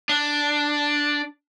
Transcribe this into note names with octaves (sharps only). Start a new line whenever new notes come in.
D4